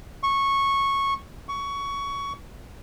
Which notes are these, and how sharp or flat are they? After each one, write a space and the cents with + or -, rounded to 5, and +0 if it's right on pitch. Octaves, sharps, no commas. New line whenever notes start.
C#6 -10
C#6 +15